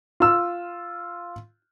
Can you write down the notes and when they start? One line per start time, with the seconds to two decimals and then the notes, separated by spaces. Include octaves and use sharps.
0.20 F4 E6